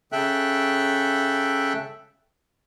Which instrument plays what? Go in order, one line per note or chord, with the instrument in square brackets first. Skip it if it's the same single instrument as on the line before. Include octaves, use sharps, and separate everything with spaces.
[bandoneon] C#3 A4 E5 G5 F#6